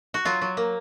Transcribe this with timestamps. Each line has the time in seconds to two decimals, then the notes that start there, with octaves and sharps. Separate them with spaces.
0.14 F#4
0.25 F#3 F4
0.41 F#3
0.57 A#3